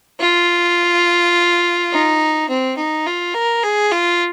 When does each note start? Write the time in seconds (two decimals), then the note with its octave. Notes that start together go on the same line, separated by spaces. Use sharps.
0.20 F4
1.92 D#4
2.49 C4
2.77 D#4
3.06 F4
3.34 A#4
3.63 G#4
3.91 F4